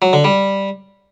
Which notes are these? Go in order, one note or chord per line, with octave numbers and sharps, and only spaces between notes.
F#3
D3
G3